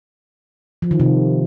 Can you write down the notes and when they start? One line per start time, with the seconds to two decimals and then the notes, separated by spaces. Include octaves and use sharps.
0.82 F3
0.91 D#3
1.00 C3